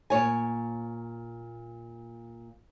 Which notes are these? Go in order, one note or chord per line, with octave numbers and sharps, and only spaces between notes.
A#2 C#5 G#5